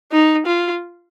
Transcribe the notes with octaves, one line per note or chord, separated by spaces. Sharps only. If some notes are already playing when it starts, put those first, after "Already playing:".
D#4
F4